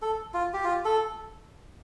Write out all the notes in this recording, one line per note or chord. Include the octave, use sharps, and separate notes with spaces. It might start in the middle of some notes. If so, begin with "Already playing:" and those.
A4
F4
G4
F4
A4